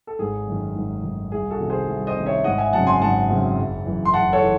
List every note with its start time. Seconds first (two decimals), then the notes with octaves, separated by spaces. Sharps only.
0.07 A4
0.19 G#1 G#4
0.47 F#2 D#3
0.75 G#1
1.03 F#2 D#3
1.32 C2 G#4
1.51 F#4 A4
1.60 C3 D#3
1.70 G#4 C5
1.88 C2
2.07 C5 D#5
2.17 C3 D#3
2.26 C#5 E5
2.44 G#1 D#5 F#5
2.58 E5 G#5
2.73 F#2 C#3 F#3 C4 F#5 A5
2.87 G#5 C6
3.01 G#1 F#5 A5
3.29 F#2 C#3 F#3 C4
3.58 F#1
3.86 F#2 E3
4.05 C6
4.13 F#1 F#5 A5
4.33 A4 C#5
4.42 E3